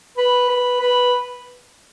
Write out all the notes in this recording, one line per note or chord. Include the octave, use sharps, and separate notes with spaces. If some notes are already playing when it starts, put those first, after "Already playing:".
B4
B4
B4